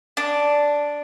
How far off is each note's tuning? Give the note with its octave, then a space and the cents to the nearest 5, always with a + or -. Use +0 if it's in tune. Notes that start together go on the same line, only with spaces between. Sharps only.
D4 -5